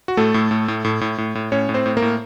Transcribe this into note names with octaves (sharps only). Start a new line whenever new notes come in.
F#4
A2 A3 A4
A2
A2
A2
A2
A2
A2
A2
A2 C#4 C#5
A2
C4 C5
A2
A#3 A#4
A2